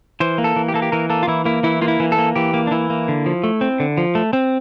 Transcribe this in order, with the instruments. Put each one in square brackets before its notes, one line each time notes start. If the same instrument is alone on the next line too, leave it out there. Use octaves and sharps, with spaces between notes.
[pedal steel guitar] E3 C5
A#3
A4
E3
G4
A#3 A4
G4
E3 A#4
A#3 A4
F4
E3 E4
A#3 E4
E3 E4
A#3 F4
E4
E3
A4
A#3
E3 G4
A#3
D4
E3 E4
A#3
D3
F3
A3
C4
D3
F3
A3
C4